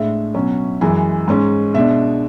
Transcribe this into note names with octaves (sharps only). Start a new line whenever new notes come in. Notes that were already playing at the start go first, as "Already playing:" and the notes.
Already playing: A2 G#3 D4 E5
B2 F#3 C#4
F#2 E3 G#3 G#5
G#2 G#3 C#4
B2 G#3 D4 E5